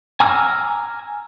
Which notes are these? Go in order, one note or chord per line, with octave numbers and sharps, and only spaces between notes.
G#5 A#5 D6 E6 F6